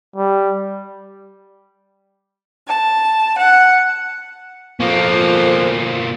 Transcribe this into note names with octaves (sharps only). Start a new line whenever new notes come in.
G3
A5
F#5
F2 B2 F3 A#3